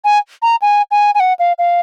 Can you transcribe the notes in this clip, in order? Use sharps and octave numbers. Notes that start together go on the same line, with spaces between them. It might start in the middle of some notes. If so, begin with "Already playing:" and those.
G#5
A#5
G#5
G#5
G#5
F#5
F5
F5